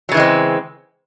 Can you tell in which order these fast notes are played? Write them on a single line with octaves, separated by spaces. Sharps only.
F#3 C#3 E3 G#3 C4